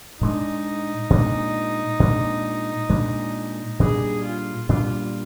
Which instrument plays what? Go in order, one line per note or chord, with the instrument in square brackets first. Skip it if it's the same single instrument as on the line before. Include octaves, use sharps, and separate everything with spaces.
[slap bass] A#2 G#3 D4 [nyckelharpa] D#4
[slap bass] A#2 G#3 D4
A#2 G#3 D4
A#2 G#3 D4
[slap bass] A#2 G3 D4 [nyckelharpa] G#4
[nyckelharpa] F4
[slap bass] A#2 G3 D4 [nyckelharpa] F4